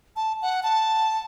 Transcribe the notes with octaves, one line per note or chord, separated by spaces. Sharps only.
A5
F#5
A5